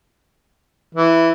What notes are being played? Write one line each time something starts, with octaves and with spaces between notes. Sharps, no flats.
E3